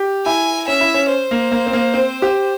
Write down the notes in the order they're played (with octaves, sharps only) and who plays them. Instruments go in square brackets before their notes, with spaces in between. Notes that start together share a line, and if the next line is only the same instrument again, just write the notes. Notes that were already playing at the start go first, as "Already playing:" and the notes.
Already playing: [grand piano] G4
[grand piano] E4 [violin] G#5
[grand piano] C#4 [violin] E5
[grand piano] E4
C#4
[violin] C5
[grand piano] A#3
A#3
C4
A#3
C4
G4